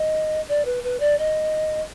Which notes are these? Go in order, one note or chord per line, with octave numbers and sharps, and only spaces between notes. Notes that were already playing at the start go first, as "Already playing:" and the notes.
Already playing: D#5
D5
B4
B4
D5
D#5